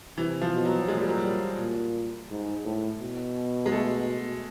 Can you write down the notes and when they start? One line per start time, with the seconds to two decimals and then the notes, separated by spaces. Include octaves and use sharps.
0.18 C3 E3
0.41 F3
0.53 B2
0.65 F#3
0.88 A#2 G#3
0.98 G3
1.08 F#3
1.18 G3
1.59 A#2
2.30 G#2
2.65 A2
3.00 B2
3.66 G#3
3.71 A3